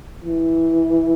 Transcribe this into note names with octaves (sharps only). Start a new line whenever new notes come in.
E3